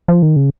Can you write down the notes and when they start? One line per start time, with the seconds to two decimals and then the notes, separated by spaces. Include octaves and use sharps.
0.08 F3
0.22 D#3
0.36 C#3